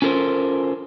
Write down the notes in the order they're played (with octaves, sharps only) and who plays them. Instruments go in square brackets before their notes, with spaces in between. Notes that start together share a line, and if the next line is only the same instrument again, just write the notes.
[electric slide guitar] C#4 F4 A4 A#4 C5